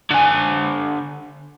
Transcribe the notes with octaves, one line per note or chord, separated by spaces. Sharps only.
D3 G#5